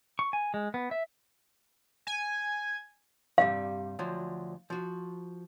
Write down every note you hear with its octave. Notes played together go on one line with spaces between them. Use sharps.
C#6
G#5
G#3
B3
E5
G#5
G2 C3 G3 F5
D2 F3 F#3
F3 F#4